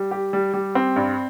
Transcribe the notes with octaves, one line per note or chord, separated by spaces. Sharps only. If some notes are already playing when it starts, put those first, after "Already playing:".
Already playing: G3
G4
G3
G3
C4
G2